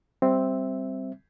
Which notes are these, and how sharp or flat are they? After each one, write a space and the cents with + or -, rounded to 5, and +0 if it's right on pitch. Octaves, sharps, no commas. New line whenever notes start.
G3 +0 C4 +0 E5 +0